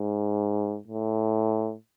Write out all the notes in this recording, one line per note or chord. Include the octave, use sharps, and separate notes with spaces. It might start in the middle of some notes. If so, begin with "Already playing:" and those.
Already playing: G#2
A2